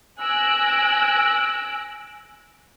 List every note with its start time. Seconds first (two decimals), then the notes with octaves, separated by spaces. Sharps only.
0.21 G#5 E6 F#6 A#6 D7